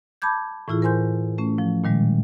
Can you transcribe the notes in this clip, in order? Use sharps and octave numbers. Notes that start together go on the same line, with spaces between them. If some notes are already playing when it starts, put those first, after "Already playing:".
A5 B5 D6 G6 G#6
A2 E3 E4 F4 G#4
A#4 C5 G#5 C6 G6
A3 C#4
F3
A#2 D#3 G3 G#3